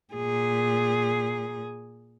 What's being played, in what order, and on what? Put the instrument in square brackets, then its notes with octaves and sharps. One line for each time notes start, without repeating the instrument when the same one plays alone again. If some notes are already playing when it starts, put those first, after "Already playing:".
[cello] A#2 G#4